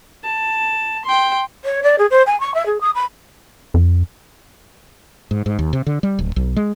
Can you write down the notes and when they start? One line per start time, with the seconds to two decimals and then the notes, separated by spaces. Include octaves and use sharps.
0.24 A5
1.05 G5 C6
1.65 C#5
1.83 D5
1.98 G#4
2.11 C5
2.26 G#5
2.41 C#6
2.54 E5
2.66 G#4
2.81 D#6
2.95 B5
3.74 F2
5.31 G#2
5.46 G#2
5.59 D#2
5.73 C3
5.86 D3
6.03 G3
6.19 D1
6.36 B1
6.57 G#3